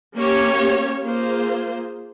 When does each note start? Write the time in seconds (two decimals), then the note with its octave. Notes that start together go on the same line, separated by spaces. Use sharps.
0.17 A#3 C#4 G4 C#5
1.03 A#3 F4 G#4 C5